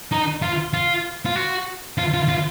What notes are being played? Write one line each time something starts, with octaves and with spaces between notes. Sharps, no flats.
D#4
F4
F4
F4
F#4
F4
F4
F4